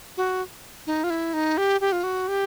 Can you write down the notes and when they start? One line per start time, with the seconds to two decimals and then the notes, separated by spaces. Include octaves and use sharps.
0.17 F#4
0.87 D#4
1.04 F4
1.10 E4
1.33 D#4
1.58 G4
1.81 G4
1.92 F4
2.03 F#4
2.28 G4